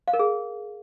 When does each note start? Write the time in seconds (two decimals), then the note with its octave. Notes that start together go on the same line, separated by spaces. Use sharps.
0.08 F5
0.13 A#4
0.19 G#4